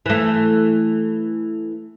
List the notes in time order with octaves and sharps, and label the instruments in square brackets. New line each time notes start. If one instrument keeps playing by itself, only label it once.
[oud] E3 A3